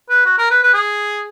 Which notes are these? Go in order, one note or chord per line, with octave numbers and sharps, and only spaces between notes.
B4
F#4
A#4
B4
B4
G#4